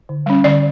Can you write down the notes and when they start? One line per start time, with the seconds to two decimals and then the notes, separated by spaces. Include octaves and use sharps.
0.09 D3
0.26 G3 C#4
0.44 D3 D5